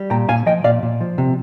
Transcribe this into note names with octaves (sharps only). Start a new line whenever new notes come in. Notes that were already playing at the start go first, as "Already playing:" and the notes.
Already playing: G3
A#2 G5 A#5
A#2 F5 G#5
F3 D#5 G5
A#2 D5 F5
A#2
F3
C3